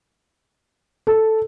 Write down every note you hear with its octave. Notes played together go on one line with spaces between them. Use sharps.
A4